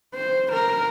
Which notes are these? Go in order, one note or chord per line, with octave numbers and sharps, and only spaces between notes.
C5
A#4